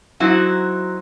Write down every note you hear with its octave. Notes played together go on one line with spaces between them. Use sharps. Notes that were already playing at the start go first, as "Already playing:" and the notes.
F#3 C4 D#4 E4 F#4